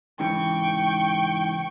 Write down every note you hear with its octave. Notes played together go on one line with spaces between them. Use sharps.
G#2 C#3 E3 G5 C#6